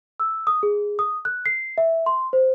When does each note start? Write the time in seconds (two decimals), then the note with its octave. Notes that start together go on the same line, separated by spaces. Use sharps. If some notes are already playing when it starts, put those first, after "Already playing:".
0.20 E6
0.47 D#6
0.63 G#4
0.99 D#6
1.25 F#6
1.46 C7
1.78 E5
2.06 C6
2.33 C5